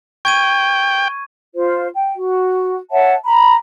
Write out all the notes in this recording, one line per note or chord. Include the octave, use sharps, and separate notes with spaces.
G5 C#6 G#6 D#7
F4 C5
G5
F#4
C#5 E5 F#5 A5
A#5 B5